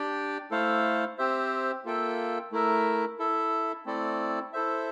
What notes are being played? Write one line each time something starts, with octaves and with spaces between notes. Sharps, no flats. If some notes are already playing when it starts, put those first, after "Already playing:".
Already playing: D4 G4 D5 G5
A3 E4 A4 C5 F5
C4 G4 C5 E5
A#3 F4 A4 E5 G5
A3 E4 A#4 E5
E4 A4 E5
A3 C4 E4 A4 D5
E4 A4 C5 E5